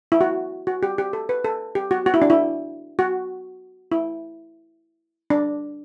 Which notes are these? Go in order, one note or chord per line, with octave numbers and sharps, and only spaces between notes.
E4
F#4
F#4
G4
G4
A4
B4
A4
G4
F#4
F#4
E4
D4
E4
F#4
E4
D4